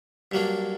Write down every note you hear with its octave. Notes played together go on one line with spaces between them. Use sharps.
G2 F#3 A#3 D4